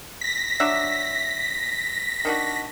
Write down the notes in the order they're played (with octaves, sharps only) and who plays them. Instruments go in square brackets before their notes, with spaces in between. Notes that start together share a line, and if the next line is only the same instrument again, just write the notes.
[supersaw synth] A#6 B6
[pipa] F#3 D4 E5
D#3 D4 F#4